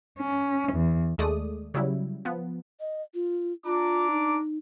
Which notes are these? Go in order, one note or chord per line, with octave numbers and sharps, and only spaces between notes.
C#4
E2
D#2 G#3 A3 D5 D#6
C#3 F#3 G3 E4
F3 B3
D#5
F4
D4 F4 A#5 D6
D#4